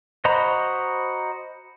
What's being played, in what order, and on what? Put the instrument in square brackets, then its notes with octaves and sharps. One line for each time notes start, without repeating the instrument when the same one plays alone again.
[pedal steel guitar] F#4 C5 D#5 A#5 B5